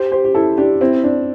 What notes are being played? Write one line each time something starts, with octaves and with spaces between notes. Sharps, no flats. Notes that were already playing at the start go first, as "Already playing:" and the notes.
Already playing: G4 C5
G4 C5
G4
E4 A4
D4 G4
C4 E4
D4